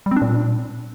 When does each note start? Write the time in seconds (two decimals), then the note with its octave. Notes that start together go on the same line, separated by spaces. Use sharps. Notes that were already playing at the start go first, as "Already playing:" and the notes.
0.06 G3
0.11 C4
0.16 D4
0.22 A#2